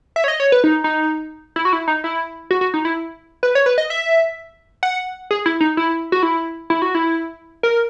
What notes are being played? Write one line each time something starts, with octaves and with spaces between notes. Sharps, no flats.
E5
C#5
D#5
C#5
B4
D#4
D#4
E4
F#4
E4
D#4
E4
F#4
F#4
D#4
E4
B4
C#5
B4
D#5
E5
F#5
G#4
E4
D#4
E4
F#4
E4
E4
F#4
E4
A#4